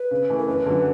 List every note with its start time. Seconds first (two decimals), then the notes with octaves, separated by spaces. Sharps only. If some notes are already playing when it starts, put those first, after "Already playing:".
Already playing: B4
0.11 C#3
0.30 E3 A3
0.38 A#4
0.47 F#2 B4
0.66 D3 F#3